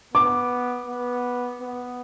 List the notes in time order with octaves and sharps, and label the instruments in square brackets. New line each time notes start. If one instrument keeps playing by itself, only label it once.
[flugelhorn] B3 [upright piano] D6
[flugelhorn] B3
B3